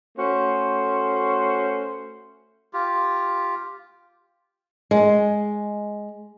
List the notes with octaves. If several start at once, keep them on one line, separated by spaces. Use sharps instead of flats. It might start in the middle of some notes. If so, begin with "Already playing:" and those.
A3 C#4 F#4 C5
F4 G4
G#3